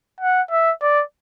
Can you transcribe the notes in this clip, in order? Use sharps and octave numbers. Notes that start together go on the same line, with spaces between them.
F#5
E5
D5